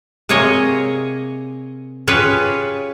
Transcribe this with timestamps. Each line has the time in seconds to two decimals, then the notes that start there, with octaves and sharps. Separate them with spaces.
0.29 C3 A#3 G#4 C#5 D#5
2.08 C#4 F4 G4 G#4 B4 C#5